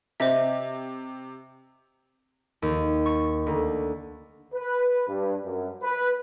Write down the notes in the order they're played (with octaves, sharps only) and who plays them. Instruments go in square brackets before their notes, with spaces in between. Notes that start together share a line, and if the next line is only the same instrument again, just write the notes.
[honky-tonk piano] C3 [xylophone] C5 D#5 E5
[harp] D#2
C#6
D2
[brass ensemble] B4
G2
F#2
B4